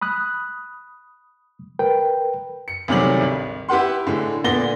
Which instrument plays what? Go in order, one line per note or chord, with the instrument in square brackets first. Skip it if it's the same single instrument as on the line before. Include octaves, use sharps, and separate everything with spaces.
[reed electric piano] B5 D#6 F#6
A#4 B4 G5
[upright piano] C#7
D2 C3 D#3 F#3 G3 F#7
G#1
E4 G4 B4 F#5 C6
A2 D3 G#3
A#2 D3 B3 D5 A#6 G7